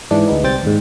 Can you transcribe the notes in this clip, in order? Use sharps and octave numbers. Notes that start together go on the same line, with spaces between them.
G#2 E3 D4
D2 G#3 B3 D#4
C2 G3 C4 G5 A6
D#2 G#2